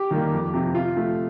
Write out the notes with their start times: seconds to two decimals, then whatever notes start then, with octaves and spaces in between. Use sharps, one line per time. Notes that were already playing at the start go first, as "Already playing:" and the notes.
Already playing: G4
0.11 D#3 G3 A#3
0.32 F2
0.53 C3 F3
0.74 C3 F4
0.96 F3 A3